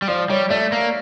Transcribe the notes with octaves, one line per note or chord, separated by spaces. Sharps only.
G3
F3 D5
G3 C#5
A3 D5
A#3